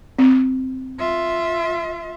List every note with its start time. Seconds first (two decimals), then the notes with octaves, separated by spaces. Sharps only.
0.19 C4
1.00 F4 E5